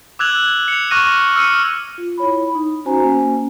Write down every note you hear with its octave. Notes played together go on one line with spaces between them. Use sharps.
D6 E6 F#6 G#6 F7 F#7
C#7 F7
C#6 D6 F6 F#6 A#6 D#7
E6 F6 C#7 D#7
F4
E4 C#5 B5
D#4
C#4 F#4 C5 G#5 A#5
A#3 C#4 G#5